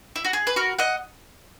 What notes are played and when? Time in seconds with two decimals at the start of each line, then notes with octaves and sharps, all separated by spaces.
0.16 E4
0.25 F#4
0.33 G#4
0.47 B4
0.56 F#4 A#4
0.79 D#5 F#5